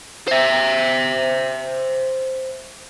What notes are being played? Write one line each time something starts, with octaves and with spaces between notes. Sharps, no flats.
C5 E5